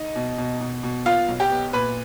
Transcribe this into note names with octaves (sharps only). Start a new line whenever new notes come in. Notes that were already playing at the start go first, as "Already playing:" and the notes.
Already playing: D#4 D#5
B2
B2
B2
B2
B3 F4 F5
B1
G4 G5
B3
A#2 B4 B5